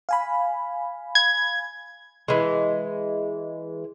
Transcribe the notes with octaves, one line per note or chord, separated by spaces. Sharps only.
F5 G#5 B5
G#6
E3 G#3